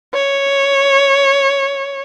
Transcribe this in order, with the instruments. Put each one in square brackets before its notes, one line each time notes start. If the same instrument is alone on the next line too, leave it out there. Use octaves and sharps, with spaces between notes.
[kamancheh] C#5